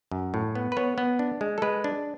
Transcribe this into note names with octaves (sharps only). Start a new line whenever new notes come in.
F#2
A2
B3
B4
B3 C#5
B3
D4
G#3
A4
G#3 B4
D4